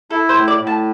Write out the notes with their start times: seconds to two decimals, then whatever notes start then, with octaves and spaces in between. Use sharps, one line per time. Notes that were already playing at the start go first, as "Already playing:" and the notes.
0.11 E4 A4
0.29 C5
0.35 A2
0.48 D5
0.61 A2
0.67 A5